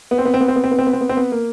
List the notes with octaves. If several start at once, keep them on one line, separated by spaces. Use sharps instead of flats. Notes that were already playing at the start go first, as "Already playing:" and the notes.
B3
C4
B3
C4
B3
C4
B3
C4
B3
C4
B3
C4
B3
C4
B3
A#3